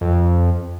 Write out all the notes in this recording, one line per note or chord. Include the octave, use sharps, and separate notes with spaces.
F2